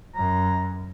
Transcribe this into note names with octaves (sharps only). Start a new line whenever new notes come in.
F#2 A#5